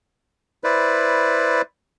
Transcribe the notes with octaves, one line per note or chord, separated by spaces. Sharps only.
E4 B4 C5 D5